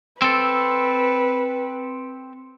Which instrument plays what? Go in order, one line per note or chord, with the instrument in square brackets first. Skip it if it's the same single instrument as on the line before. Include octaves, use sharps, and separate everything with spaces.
[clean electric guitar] C4 A4 [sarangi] B4